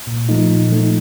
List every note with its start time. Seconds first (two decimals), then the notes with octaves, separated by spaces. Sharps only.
0.07 A#2
0.29 F3 A3 D#4
0.50 A#2
0.71 F3 A3 D#4